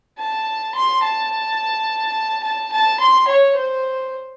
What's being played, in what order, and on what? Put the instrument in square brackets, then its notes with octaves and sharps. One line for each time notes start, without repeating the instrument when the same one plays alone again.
[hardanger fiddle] A5
C6
A5
A5
A5
C6
C#5
C5